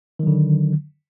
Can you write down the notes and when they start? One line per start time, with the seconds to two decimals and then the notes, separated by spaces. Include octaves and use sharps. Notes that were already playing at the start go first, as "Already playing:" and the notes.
0.19 D#3
0.23 F#3
0.27 D3